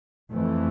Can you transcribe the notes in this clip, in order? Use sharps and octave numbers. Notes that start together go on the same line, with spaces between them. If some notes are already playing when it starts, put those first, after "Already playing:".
F2 E3 A3